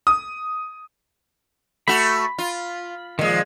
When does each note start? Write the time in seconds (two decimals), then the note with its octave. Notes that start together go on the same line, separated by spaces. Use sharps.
0.07 D#6
1.88 A3 F#4 B5
2.38 F4
3.19 A#2 D#3 F3 G#3